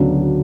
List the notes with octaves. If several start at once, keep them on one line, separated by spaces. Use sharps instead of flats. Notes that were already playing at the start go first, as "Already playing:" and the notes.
Already playing: D2 C#3 F#3 B3 D4